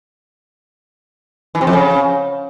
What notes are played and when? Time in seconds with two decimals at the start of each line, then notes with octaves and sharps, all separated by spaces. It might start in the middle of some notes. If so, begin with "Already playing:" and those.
1.55 E3
1.61 C3
1.67 F2
1.73 C#3